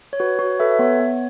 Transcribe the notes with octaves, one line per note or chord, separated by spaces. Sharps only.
C#5
F#4 B4
F#4 C#5
A4 B4 E5
E5
B3 C#5
B3